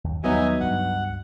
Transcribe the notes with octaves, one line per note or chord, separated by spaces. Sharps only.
D#2
D#2 F#3 G3 B3 D#4 D#5 E5 G#5
C#2 G2 F#5